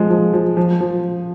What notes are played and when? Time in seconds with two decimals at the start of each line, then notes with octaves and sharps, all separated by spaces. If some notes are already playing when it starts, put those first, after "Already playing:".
Already playing: F3 G#3
0.10 F3
0.33 F3
0.57 F3
0.81 F3